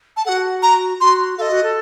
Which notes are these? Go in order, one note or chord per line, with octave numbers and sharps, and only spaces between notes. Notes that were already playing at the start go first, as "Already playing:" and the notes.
A5
F#4 A4 F#5
A#5
F#4 C6
A4 D#5 F5
F#4
A4